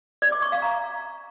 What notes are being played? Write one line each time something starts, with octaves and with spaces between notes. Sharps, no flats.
D5
D6
C#6
F5
A#5